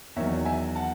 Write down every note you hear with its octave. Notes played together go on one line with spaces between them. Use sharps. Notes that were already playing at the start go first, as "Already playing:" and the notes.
E2 D#3 F#3 C#5 E5
E5 G#5
F#5 A5